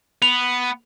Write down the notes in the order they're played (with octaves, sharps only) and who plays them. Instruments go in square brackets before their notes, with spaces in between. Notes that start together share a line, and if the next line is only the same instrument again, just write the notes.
[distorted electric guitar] B3 [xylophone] F7